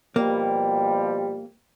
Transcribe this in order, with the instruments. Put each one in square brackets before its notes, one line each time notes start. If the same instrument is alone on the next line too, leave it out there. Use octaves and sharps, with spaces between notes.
[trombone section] B2 F3 G3 [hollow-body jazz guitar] A#3